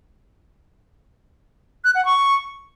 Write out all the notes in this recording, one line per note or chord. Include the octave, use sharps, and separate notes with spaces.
F#6
F#5
C#6